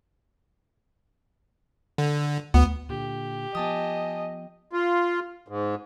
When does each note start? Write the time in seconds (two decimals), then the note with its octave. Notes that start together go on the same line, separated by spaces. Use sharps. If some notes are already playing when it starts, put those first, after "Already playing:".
1.98 D3
2.54 D2 B3
2.89 A#2 D3 G4
3.55 F3 B3 D#5 G#5 A5 D#6
4.73 F4
5.48 G#2